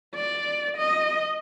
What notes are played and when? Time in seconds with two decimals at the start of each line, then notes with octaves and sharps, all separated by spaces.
0.15 D5
0.77 D#5